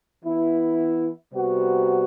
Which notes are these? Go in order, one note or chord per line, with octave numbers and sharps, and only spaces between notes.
E3 B3 E4
C3 G3 B3 F#4